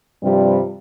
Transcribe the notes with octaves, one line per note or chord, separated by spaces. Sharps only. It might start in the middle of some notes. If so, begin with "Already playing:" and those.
G2 C3 F3 G3